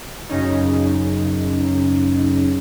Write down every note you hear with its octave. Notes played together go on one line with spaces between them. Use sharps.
F#2 C#3 C#4 D#4